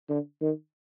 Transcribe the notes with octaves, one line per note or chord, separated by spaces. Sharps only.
D3
D#3